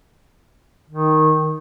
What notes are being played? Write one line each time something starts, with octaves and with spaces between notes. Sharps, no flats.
D#3